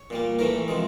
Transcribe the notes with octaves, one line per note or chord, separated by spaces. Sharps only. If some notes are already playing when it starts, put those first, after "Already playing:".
Already playing: C#5
A#2 G3 A#3
A2 E3 A3 A#4
C3 F3 G#3